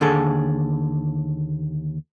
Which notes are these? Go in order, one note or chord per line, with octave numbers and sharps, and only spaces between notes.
D#2 D3 G#4 A4